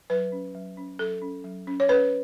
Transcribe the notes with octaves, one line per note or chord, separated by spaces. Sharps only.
F#3 B4
C#4
F#3
C#4
F#3 A4
C#4
F#3
C#4
C#5
C#4 B4